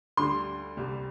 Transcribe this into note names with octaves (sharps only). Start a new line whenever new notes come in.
D2 D3 G3 C6
C2 C3 G3